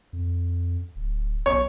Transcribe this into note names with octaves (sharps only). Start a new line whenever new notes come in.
F2
D1
B1 C#5